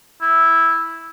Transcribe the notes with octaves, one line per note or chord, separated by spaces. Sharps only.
E4